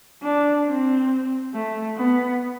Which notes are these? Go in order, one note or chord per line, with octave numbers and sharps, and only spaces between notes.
D4
C4
A3
B3